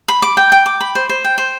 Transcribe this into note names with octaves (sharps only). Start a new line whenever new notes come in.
B5
D6
G5
G5
D6
B5
C5
C5
G5
C5